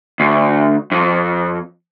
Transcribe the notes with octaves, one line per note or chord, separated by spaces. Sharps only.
D2
F2